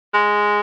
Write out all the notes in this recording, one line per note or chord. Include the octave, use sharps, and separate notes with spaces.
G#3